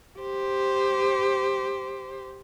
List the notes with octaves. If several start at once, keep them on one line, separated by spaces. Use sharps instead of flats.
G4 C5